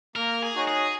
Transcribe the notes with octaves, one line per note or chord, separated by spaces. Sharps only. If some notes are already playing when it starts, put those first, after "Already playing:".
A#3 A#4
G#4
D#4 F#4 C#5 G#5
G#4